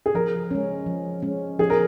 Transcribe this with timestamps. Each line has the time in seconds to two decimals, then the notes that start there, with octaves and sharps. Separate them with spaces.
0.06 G#4
0.15 F3 A#4
0.51 G#3 C#4
0.86 F3
1.22 G#3 C#4
1.59 F3 G#4
1.70 A#4